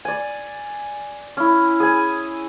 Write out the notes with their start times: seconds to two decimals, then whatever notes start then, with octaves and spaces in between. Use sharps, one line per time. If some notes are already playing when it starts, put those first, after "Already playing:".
0.05 D5 G#5
1.37 C#4 E4
1.80 G#4 G#5